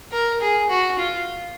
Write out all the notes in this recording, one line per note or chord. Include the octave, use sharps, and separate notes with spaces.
A#4
G#4
F#4
F4